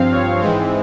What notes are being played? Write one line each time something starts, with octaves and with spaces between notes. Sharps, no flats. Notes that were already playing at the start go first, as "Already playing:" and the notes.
Already playing: G2 F3 C4 F5
C#5
G#2 E3 G#3 C4